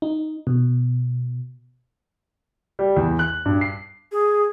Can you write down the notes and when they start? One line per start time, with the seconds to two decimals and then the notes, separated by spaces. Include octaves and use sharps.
0.02 D#4
0.47 B2
2.79 G3
2.96 E2
3.19 F#6
3.45 G2
3.61 C7
4.12 G#4